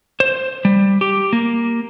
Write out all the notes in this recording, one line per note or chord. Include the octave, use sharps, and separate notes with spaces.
C5
G3
G4
A#3